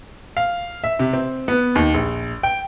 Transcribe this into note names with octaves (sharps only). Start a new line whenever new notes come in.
F5
E5
C3
C4
B3
D#2
A#1
G5